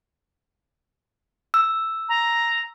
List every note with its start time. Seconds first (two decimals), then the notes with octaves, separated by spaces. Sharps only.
1.54 E6
2.09 A#5